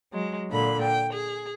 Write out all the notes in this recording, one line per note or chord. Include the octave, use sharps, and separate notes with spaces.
F#3 G#3
A#2 D3 B5
G5
G#4